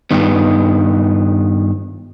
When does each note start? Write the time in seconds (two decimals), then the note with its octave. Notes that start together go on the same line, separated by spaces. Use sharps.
0.11 G2 D#3 B3